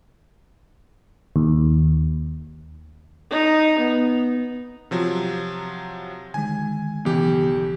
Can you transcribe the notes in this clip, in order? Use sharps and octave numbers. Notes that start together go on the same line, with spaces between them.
D#2
D#4
B3
C3 F3 F#3
D3 D#3 G#3 G#5
B1 C#3 E3 B3 G4